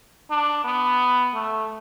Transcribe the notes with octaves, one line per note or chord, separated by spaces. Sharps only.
D4
B3
A3